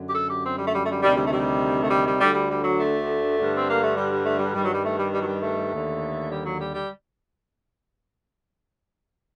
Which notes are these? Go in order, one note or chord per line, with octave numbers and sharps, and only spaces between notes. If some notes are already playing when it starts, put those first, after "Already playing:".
Already playing: F#2 D3
G4
A4
G4
C4
G3
A3
G3
A3
G3
D2 C3 D#3 G3
G3
A3
G3
A3
G3
G3
D2 D3 G3
G3
G3
F#3
A3
G2 D3
C4
A#3
A3
G3
G3
A3
G3
G2 D#3 G3
F#3
G3
A3
G3
G3
F#3
G3
A3
D#2 D3
G3
F#3
G3
G3